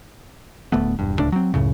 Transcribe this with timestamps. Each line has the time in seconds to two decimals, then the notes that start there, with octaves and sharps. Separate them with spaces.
0.72 D1 D2 A3 B3
0.99 E1 G2
1.17 D1 C#2 A2 D4
1.32 F#3 C4
1.54 C#2 F#2 A2 C#3